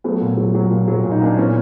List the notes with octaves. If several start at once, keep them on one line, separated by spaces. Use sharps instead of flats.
F#3 A3 B3
A#2
F#3
F#3
A#2
F#3
A#2
D#4
A#2 D4
E3 B3 C#4